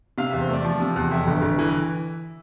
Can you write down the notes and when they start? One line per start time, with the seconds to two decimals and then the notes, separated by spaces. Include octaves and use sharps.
0.18 C3 F5
0.30 E2 E5
0.41 C5
0.49 A3 D5
0.64 F3
0.80 C3
0.96 E2
1.11 F2 E5
1.27 G1
1.42 G1
1.59 E3